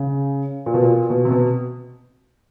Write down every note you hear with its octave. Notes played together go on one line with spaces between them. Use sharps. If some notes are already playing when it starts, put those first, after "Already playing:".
Already playing: C#3
A#2
B2
A#2
B2
C3
B2